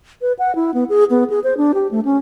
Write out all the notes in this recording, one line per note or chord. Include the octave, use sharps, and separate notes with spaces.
B4
F#5
E4
B3
G#4
B3
G#4
C5
D4
G4
A3
C#4